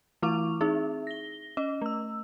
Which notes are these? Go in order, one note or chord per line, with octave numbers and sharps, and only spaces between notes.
E3 A3 E4 C#6 D6 F7
C4 D#4 G#4 E5
A#6 G7
C#4 D#5
A3 E6